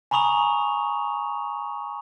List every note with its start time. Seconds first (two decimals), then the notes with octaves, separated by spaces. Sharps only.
0.11 G#5 A#5 B5 C#6 D#6 F7